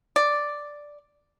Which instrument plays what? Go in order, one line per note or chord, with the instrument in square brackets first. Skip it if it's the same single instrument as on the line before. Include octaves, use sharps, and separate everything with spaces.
[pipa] D5